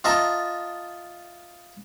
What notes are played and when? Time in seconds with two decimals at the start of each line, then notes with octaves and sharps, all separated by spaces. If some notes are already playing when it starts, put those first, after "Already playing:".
0.04 F4 D#5 E5 A5 A#5